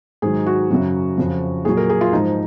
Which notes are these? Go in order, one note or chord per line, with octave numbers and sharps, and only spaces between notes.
G#2 D#3 F#3 G#4
F#4
F#2 C#3 F#3
F2 C#3 F3
A#2 F#3 G#4
A#4
G#4
F4
G#2 F3 D#4